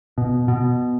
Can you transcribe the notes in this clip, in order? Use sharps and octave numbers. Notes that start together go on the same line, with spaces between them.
B2
B2